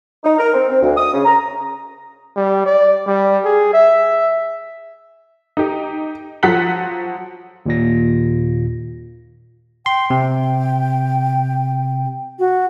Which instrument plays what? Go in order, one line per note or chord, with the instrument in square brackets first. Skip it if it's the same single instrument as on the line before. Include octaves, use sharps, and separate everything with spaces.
[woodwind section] D#4
A#4
C4
C4
D2
D#6
C#3
A#5
[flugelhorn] G3
D5
G3
G#4
E5
[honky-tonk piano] D#4 G4
F3 F#3 F#5 F#6 B6 F#7
[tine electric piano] D#2 A#2 A#6
[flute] G5 [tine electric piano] C6
[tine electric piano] C3 [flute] G5
[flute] F#4